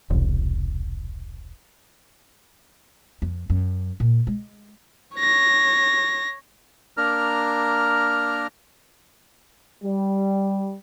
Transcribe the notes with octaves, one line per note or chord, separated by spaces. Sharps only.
E1 C2
F2
F#2
A#2
G#3
C#5 A#6
A#3 D4 A#4 A#5 F6
G3